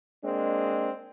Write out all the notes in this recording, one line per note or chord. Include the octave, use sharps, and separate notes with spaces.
G#3 A#3 C4 D4